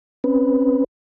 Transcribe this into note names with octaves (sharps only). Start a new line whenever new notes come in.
C4 C#4 B4